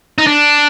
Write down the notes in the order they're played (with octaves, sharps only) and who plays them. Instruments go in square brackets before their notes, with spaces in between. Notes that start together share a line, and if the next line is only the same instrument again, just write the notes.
[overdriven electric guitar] D#4
D4